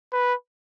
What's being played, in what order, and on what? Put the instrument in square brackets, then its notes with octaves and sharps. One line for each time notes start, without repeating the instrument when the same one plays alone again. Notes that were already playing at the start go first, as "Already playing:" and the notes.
[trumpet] B4